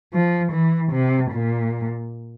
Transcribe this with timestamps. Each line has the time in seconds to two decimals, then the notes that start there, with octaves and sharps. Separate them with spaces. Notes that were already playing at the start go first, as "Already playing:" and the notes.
0.14 F3
0.52 E3
0.92 C3
1.31 A#2